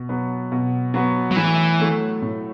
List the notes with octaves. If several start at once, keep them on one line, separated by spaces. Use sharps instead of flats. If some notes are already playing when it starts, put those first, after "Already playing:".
Already playing: B2
F#3 B3
B2
F#3 B3
F#3
A2 E3
F#3 A3
A2